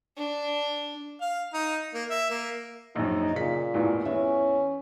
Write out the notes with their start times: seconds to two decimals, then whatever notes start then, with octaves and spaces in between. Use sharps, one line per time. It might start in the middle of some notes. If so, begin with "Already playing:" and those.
0.17 D4
1.21 F5
1.53 D#4
1.94 A#3
2.10 E5
2.30 A#3
2.96 A#1 F#2 D#4
3.35 A#2 C#3 B6
3.74 A1 E2 G2
4.05 E2 C#4 E5